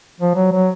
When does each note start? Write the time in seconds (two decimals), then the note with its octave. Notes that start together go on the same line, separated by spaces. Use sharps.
0.21 F3
0.35 F#3
0.52 F#3